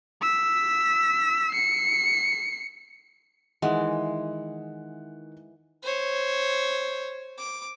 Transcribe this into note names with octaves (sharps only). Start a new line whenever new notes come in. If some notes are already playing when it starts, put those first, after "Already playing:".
E6 B6
C7 C#7
D#3 E3 G#3 F#5
C5 C#5
D6